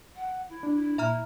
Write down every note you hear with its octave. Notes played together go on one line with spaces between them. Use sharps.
F#5
E4
D4
E4
A#2 E5 A#5 F6